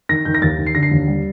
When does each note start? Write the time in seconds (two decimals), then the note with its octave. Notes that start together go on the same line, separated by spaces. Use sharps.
0.09 D#3 A#6
0.25 D#3 G6
0.34 A#6
0.42 D#2 A6
0.58 D#3
0.66 C7
0.75 D3 A#6
0.83 C7
0.91 D#2
1.07 G3